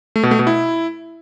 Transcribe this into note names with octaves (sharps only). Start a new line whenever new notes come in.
A3
B2
A3
B2
E4